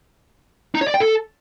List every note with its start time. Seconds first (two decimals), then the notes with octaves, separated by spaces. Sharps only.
0.75 D#4
0.81 C#5
0.88 D5
0.94 G5
1.00 A4